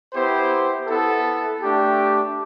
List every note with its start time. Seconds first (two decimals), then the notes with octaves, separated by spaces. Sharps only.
0.13 B3 E4 G4 C5
0.87 B3 E4 A4
1.61 A3 D4 G4